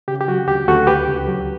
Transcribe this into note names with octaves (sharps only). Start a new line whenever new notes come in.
C#3 G4
G4
F#3 F#4
D2 G4
D2 F#4 A4
C#2 G4 B4
C#2
F#3